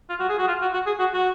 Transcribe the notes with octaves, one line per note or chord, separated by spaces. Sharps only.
F4
F#4
G#4
F#4
F4
F#4
F#4
G#4
F#4
F#4